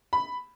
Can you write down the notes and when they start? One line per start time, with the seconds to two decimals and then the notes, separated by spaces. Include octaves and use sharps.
0.13 B5